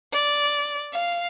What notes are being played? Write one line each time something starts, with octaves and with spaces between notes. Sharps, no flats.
D5
F5